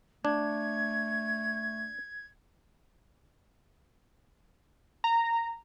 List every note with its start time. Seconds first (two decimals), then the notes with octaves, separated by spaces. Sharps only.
0.25 A3 D4 G#6
5.04 A#5